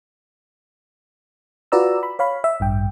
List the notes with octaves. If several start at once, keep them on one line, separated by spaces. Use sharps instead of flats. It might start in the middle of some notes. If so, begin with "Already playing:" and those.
F4 F#4 B4 D5 A#5 E6
B5
C#5 F5 B5
E5
A1 G2 G5